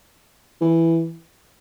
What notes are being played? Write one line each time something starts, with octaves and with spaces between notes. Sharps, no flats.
E3